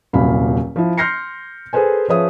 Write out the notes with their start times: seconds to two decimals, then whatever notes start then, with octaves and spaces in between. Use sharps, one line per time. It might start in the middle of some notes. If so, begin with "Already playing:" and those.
0.13 D#1 C2 A#2 F#3 F5 B5
0.76 F3 E4
0.98 C6 F6 G6 A#6 C7 C#7
1.73 G#4 A4 B4 C5 G#5
2.09 F3 G#4 B4 C#5 E5 D#6